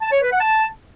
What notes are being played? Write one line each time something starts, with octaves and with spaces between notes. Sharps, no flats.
A5
C#5
B4
F#5
A5